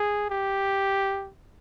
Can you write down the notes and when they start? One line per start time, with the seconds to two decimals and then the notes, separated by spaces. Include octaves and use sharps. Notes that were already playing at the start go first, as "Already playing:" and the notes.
Already playing: G#4
0.30 G4